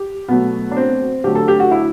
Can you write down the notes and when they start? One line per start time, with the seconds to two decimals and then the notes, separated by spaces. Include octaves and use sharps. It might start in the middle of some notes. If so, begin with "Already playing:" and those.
Already playing: G4
0.28 B2 F#3 A3 B3
0.71 D4
0.77 C4
1.24 D3 F#3 A3 G4
1.35 A4
1.48 G4
1.60 F#4
1.71 E4